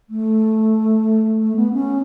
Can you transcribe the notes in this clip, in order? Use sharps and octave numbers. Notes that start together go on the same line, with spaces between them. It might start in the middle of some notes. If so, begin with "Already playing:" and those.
A3
A3
B3
C#4